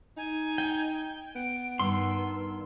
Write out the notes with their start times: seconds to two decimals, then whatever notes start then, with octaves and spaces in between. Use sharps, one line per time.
0.17 D#4 G#5
0.58 G5
1.36 B3 D7
1.79 G2 D#3 C6 E6